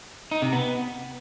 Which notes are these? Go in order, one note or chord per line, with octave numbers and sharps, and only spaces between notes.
D#4
C3
B3